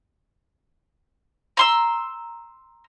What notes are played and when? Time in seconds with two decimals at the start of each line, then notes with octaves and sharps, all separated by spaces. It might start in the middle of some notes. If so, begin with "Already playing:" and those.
1.57 A#5 C6 E6